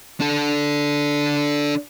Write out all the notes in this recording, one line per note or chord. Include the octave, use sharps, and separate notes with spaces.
D4 A4